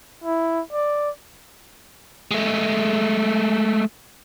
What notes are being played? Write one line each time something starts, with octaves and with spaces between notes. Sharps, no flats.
E4
D5
G#3 A3